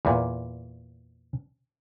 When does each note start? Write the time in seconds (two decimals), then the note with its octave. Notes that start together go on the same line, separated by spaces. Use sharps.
0.05 E2 A#2